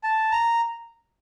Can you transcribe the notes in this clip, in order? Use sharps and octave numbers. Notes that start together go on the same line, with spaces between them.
A5
A#5